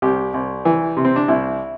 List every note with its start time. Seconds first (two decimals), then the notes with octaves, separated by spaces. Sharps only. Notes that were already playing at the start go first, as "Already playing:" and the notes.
0.02 C2 G4
0.34 C2
0.65 E3
0.97 C3
1.05 C4
1.16 D4
1.28 C2 E4